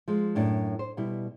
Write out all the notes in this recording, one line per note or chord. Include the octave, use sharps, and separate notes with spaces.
F3 G#3
F#2 A2 D4
C5
B2 G3 E4